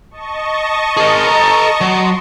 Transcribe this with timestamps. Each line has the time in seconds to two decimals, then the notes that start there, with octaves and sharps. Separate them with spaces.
0.11 D#5 A5 C#6
0.97 G#4 A#4
1.27 A4 A#5
1.81 F#3 C6